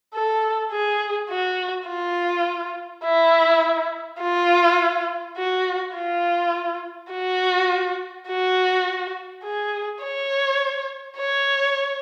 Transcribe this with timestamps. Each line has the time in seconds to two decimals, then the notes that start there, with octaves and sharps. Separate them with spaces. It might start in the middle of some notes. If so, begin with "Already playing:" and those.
0.14 A4
0.72 G#4
1.30 F#4
1.88 F4
3.04 E4
4.20 F4
5.37 F#4
5.95 F4
7.11 F#4
8.28 F#4
9.44 G#4
10.02 C#5
11.18 C#5